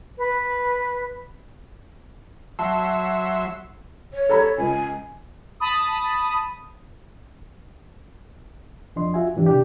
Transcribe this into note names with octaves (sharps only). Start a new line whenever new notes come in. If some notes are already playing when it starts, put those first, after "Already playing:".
B4
F#3 E5 A5 C6
C#5
A4 A#5 B5
C#2 G#5
A5 B5 D#6
F2 F3 D4 D#5 C6
F4 F#4 E5 G#5
E2 G#2 E3 D4 G4
C#2 C3 D4 G4